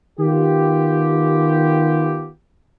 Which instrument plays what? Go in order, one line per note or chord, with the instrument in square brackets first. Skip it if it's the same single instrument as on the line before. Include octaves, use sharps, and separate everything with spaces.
[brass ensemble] D#3 B3 F4 G4